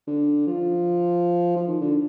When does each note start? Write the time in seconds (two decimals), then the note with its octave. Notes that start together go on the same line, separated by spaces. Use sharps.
0.07 D3
0.47 F3
1.56 F3
1.67 D#3
1.81 D3